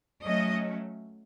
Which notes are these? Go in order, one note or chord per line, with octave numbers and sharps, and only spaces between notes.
F#3 A3 C#4 D#5